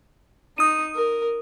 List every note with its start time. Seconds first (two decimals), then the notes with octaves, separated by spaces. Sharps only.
0.58 D#4 D#6 D#7
0.95 A#4